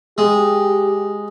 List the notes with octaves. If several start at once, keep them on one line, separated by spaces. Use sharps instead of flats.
G#3 G4